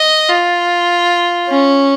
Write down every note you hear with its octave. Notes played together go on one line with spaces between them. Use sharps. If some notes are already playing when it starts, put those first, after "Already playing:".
Already playing: D#5
F4
C#4